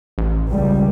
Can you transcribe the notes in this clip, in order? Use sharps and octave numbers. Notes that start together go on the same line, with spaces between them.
A1
C#2 G3